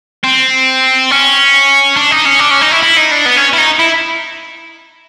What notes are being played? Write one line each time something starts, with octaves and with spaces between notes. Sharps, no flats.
C4
C#4
D4
D#4
C#4
D4
C#4
D#4
E4
E4
D#4
D4
B3
C#4
E4
D#4
E4